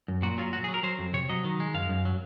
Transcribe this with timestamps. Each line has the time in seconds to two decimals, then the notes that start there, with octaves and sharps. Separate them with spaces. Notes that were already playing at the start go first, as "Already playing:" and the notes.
0.08 F#2
0.22 A#2 F#4
0.38 F#3 F4
0.53 F#3 F#4
0.64 G#4
0.68 F#3
0.74 A#4
0.83 F#3 C5
0.99 F2
1.13 C3 C#5
1.29 F#3 D#5
1.44 D#3
1.60 G#3
1.74 F#2 F5
1.89 F#2
2.05 F#3